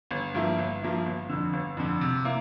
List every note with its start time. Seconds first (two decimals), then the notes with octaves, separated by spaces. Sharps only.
0.11 G1
0.35 G2 F3 A#3 E4
0.58 G1
0.82 G2 F3 A#3 E4
1.06 G1
1.29 F2 D3
1.53 G1
1.77 F2 D3
2.01 C3
2.25 A#3 E4